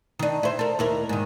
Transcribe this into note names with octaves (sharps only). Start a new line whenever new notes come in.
D#3 D4
E4 C5
A4 A#4
D#2 E4 A#4
G#2 D#3